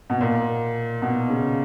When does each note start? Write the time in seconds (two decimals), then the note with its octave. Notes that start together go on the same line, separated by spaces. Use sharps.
0.10 B2
0.20 A#2
1.02 B2
1.29 C#3